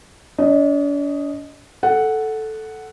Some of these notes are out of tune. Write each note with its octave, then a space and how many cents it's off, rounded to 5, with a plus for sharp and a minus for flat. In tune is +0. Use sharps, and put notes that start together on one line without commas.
D4 -45 D#5 +0
A4 -5 F#5 +0